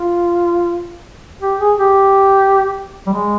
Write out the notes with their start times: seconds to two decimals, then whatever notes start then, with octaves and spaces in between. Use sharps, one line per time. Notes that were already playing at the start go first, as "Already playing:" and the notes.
Already playing: F4
1.41 G4
1.60 G#4
1.78 G4
3.07 G3
3.13 G#3